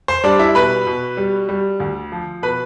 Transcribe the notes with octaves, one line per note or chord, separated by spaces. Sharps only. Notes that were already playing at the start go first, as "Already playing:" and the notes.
C5
G3 D4 D5
E4 E5
B2 B4 B5
B2
G3
G3
D2
F3
B2 B4 B5